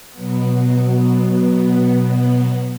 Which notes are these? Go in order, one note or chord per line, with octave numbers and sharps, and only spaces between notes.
B2 F#3 B3